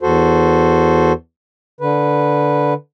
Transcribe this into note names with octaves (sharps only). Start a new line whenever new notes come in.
E2 F#4 A4 C5
D3 B4